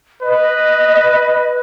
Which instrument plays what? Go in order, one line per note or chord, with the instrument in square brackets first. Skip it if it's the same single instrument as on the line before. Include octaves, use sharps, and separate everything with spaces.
[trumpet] B4 [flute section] D#5